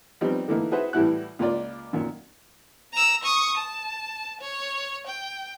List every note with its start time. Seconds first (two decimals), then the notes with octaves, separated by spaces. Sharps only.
0.21 F3 G3 B3 C4 D#4
0.48 D3 E3 A3 A#3 D#4
0.72 F#4 G#4 B4 C5 E5 F#5
0.93 A2 E3 G3 E4 F#4 F#6
1.39 C#2 A#3 F4 D5
1.93 F#2 A#2 D#3
2.93 A#5 E6
3.23 C#6 D#6
3.57 A5
4.41 C#5
5.07 G5